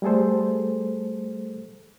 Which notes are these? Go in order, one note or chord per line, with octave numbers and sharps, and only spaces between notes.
G3 A3 G#4 A4 C5